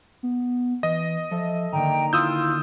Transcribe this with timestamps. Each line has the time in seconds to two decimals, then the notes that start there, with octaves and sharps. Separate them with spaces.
0.23 B3
0.83 E3 D#5
1.31 F3 A4 E5
1.73 D3 D#3 A#3 G5 A#5
2.13 E4 F4 D#6 E6 G6